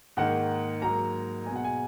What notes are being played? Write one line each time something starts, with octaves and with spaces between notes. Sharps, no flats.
G#2 D#3 A#3 F#5
G#2 F#3 A#3 A#5
B2 G#3 G#5
F#5
G#5